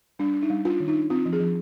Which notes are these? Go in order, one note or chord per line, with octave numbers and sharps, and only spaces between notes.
G3 D4
D4
D#4
G3
D4 F4
D#3
D#4
D4
C4 F4
F3
G#4
F3